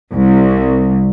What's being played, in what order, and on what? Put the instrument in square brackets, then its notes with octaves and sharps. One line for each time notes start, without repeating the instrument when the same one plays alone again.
[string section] C2